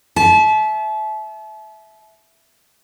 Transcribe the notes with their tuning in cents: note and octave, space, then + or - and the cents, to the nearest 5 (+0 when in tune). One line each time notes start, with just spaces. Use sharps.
E5 +0 A5 -40